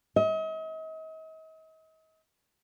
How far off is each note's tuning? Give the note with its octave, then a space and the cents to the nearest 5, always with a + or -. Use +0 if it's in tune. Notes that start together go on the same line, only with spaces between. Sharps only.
D#5 +40